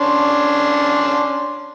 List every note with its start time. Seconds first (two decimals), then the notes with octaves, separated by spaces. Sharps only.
0.01 C#4 D4 C6